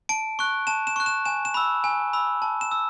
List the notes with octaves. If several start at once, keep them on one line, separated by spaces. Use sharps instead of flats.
A5 D7
C#6 F#6
A5 E7
E7
C#6 F#6
E7
G#5 E7
E7
B5 E6
G#5
B5 E6
A5
E7
E6